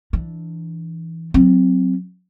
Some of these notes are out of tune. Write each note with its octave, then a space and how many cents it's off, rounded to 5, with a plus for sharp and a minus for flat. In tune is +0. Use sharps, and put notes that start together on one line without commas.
E3 +0 D4 +0
F#3 +0 C4 +0